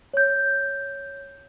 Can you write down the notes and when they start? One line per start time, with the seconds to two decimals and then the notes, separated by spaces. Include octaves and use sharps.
0.14 C#5 G6